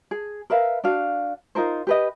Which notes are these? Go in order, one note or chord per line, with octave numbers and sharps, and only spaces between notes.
G#4
A#4 B4 E5 F5
D4 F#4 F5
D#4 F4 A#4 C5
G4 B4 D#5